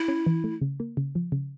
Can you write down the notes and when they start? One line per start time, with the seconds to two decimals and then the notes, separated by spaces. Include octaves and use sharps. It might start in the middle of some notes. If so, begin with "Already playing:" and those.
Already playing: E4
0.08 C#4
0.26 E3
0.44 A3
0.61 C#3
0.80 A#3
0.97 C#3
1.15 F3
1.32 C#3